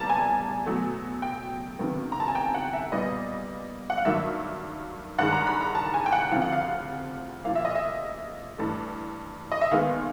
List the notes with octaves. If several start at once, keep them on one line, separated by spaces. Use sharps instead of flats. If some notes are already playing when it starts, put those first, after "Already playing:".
Already playing: C2 A#2 G3 B3 A5 A#5
G#5
B2 F#3 A3
G5
C#2 C3 D#3 F#3 B3
A#5
A5
G#5
G5
F#5
E5
A#2 G3 B3 D#5
F#5
F5
G2 D#3 F#3 A#3 E5
G2 D#3 G#3 F#5
A#5
B5
A#5
A5
G#5
G5
F#5
D2 C3 F3 F5
F#5
F5
A#2 F3 A#3 F5
E5
D#5
E5
G2 E3 A3
D#5
E5
D#2 D#3 G#3 B3 F5